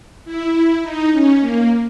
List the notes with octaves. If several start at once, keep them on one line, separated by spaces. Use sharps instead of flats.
E4
D#4
C#4
A#3